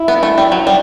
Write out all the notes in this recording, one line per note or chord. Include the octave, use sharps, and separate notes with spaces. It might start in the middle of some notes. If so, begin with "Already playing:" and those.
Already playing: E4
B3
A3
G3
F#3
G3